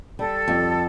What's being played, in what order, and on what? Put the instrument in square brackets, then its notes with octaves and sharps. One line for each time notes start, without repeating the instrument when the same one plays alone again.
[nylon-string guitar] G3 [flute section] A4
[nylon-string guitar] F2